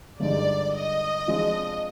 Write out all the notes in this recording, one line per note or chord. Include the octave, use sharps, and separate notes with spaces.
G1 G2 D3 G#3 D#4 D5
D#5
C3 F3 G#3 D4 F4